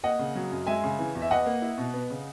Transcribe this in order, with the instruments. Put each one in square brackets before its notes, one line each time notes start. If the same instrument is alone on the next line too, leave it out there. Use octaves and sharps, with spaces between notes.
[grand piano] A#3 [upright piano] D#5 F#5
[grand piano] C#3
F#3
F#2
[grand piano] G#3 [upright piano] E5 G#5
[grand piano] C#3
E3
E2
[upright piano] E5
[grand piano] B4 [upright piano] D#5 F#5
[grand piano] A#3
E4
B2
B3
C#3